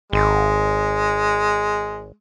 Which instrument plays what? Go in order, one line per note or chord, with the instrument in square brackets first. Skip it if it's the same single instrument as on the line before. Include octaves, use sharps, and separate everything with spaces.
[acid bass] G#1 [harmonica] G#3